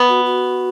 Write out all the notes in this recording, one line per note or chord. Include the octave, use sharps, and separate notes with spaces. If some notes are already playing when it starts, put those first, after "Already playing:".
Already playing: B3
F#4
F#4